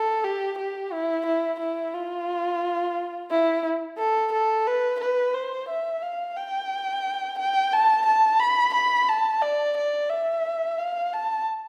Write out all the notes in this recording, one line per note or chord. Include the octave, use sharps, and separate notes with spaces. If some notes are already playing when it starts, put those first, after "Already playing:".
Already playing: A4
G4
G4
E4
E4
E4
F4
E4
A4
A4
B4
B4
C5
E5
F5
G5
G5
A5
A5
B5
B5
A5
D5
D5
E5
F5
A5